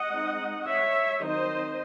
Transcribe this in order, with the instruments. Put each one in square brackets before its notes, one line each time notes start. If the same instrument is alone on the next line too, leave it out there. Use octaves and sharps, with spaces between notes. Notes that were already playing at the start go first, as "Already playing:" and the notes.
Already playing: [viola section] D#5 F#5
G#3 C4 D#4
C#5 E5
D#3 F#3 C4 D#4 C5 D#5